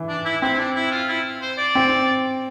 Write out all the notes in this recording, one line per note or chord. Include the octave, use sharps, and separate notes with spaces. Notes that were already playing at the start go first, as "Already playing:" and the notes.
Already playing: E3
D4
E4
C4 E4
D4
E4
F4
E4
C5
D5
C4